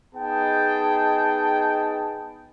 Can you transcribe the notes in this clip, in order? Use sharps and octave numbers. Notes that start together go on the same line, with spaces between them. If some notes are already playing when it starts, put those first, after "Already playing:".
B3 D#4 G#4 D#5 G5 A5